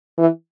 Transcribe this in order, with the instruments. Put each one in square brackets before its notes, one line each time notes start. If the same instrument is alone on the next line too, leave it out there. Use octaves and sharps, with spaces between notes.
[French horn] E3